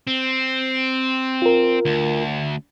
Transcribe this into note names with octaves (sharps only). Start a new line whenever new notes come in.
C4
F4 A#4
D2